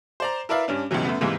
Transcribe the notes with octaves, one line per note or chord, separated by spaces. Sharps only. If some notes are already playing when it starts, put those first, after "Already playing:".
C5 D5 A#5
E4 A#4 B4 D5 E5 F5
G2 C#4 D4
C#2 G2 B2 E3 F#3
F#2 A3 B3
G#2 C3 E3 G3 G#3 A#3